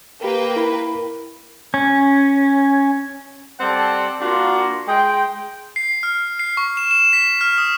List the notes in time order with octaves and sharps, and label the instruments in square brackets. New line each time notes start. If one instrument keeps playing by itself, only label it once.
[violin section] A#3 B4 G5 [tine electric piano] G4 A#4
[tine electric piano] E4 A#4 B5
[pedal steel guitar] C#4
[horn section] G3 C4 A4 D5 F#5
A#3 D4 F4 F#4
G#3 G5
[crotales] C7
F6
C7
C#6
E7
E7
B6
F6
D#6